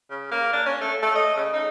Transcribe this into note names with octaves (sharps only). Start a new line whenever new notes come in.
C#3
A#3
D4
C#4
A3
A3
D#5
C#3
D#4